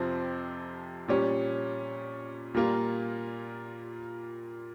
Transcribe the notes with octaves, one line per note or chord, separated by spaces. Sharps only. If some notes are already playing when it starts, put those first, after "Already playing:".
Already playing: F2 C3 F3 C4
A#2 G3 C#4
A#2 G3 A#3 F4